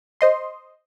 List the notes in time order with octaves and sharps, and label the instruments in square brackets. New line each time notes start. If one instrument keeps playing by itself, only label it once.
[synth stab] C5 D#5 C6